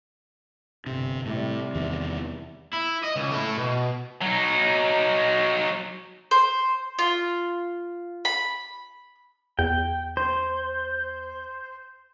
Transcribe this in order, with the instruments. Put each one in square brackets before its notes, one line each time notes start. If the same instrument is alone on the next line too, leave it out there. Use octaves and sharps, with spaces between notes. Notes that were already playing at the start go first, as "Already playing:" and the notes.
[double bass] G1 [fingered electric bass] C3
[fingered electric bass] A2 [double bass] C3 G3
[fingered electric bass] E2 D#3
[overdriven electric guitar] E4
D#5
C#2
A3 E4
B2
[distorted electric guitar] F#3 D#4
[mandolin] C5
F4
B5
[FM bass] E2 [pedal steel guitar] G5
[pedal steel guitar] C5